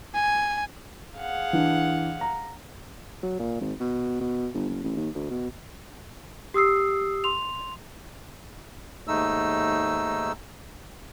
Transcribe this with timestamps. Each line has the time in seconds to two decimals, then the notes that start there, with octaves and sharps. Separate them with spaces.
0.15 G#5
1.16 G#4 F5 F#5
1.53 E3 D4
2.21 A#5
3.23 F#3
3.39 A#2
3.61 G#1
3.80 B2
4.21 B2
4.54 G1
4.69 F#1
4.84 A1
4.97 D#2
5.15 D2
5.31 B2
6.54 G4 D#6 E6 C7
7.24 C6 F7
9.08 D#2 G#2 A3 D#4 E6